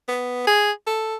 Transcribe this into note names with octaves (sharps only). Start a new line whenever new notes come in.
B3
G#4
A4